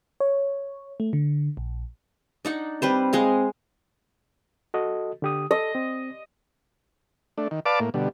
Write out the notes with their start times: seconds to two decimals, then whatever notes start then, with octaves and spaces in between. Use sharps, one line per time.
0.20 C#5
1.00 A3
1.13 D3
1.57 A#1
2.45 D4 D#4 F#5
2.82 G3 C4 B4 C5
3.13 G#3 D#5 F5
4.74 F#4 A4 D#5
5.22 D3 G4 D#6
5.51 A4 D#5
5.75 C4
7.38 A3 D4
7.51 D#3
7.66 B4 D5 F5 A5 D6
7.80 A2 A#3
7.94 B2 D3 G3